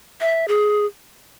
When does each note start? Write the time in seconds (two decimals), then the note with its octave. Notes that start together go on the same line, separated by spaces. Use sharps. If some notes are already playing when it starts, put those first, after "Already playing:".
0.21 E5
0.48 G#4